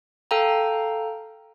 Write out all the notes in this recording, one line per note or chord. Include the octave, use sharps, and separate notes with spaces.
A4 F5 G5 A#5